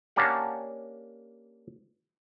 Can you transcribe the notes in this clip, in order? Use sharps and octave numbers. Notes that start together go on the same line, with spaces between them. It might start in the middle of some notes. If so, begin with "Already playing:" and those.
A#3 C#4 D4 G4 F#5